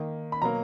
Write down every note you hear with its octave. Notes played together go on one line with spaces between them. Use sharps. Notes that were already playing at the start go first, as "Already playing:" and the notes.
Already playing: D#3 A#3
B5
B2 F#3 A#3 A#5